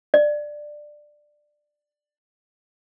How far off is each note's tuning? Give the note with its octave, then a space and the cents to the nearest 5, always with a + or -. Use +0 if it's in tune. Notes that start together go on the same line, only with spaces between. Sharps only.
D5 +15